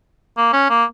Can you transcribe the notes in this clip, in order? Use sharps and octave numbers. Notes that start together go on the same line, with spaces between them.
A#3
C#4
A#3